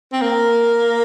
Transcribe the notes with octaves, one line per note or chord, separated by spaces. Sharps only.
C4
A#3